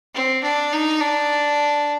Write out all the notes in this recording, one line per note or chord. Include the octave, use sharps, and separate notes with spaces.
C4
D4
D#4
D4